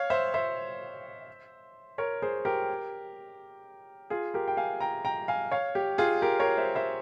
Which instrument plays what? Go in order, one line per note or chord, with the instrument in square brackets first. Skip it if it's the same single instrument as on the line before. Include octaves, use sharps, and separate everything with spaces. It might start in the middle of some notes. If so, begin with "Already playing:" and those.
Already playing: [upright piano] C#5 F5
C5 E5
C5 E5
A#4 C#5
G#4 C5
G4 A#4
F4 G#4
G4 A#4
G5
F5 G#5
G5 A#5
G5 A#5
F5 G#5
C#5 F5
G4
F4 G#4
G4 A#4
A#4 C#5
C5 E5
C5 E5